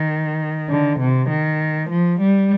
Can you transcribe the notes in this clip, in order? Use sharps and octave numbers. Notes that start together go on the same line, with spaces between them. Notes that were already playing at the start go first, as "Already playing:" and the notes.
Already playing: D#3
D3
C3
D#3
F3
G3